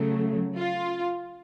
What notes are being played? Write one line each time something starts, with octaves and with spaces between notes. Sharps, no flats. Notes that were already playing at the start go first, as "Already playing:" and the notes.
Already playing: C#3 F#3 A3
F4